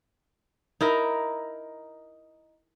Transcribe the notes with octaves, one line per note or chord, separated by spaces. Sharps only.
D#4 E4 A#4